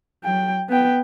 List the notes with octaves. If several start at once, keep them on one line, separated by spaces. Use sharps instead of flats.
F#3 G5
B3 G5